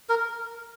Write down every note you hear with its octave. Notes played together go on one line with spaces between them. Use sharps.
A#4